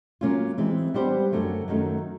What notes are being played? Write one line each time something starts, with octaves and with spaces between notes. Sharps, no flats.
F#3 A#3 C#4 F4
E3 G#3 C4
G3 B3 D4 G4 C5
F#2 D3 F#3 A3
F#2 D#3 F#3 A3 C#4